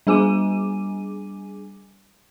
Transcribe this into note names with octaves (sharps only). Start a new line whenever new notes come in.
G3 D4 G#4 G#5 D6 D#7